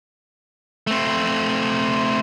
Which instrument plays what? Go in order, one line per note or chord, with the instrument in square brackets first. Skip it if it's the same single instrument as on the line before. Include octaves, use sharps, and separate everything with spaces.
[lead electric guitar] A3 C4